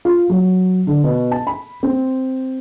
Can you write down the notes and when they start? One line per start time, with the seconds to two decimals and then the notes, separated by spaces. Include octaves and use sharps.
0.05 F4
0.29 F#3
0.87 D3
1.04 B2
1.31 A5
1.47 B5
1.83 C4